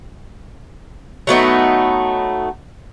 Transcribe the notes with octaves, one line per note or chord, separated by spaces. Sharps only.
F#3 A3 B3 D#4